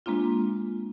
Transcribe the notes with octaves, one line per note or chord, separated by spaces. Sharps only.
G#3 A#3 C4 D4 F4